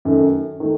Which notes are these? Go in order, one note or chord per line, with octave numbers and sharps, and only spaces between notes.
F#2 D#3 A3
D#3 A3